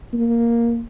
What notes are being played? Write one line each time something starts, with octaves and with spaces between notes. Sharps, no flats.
A#3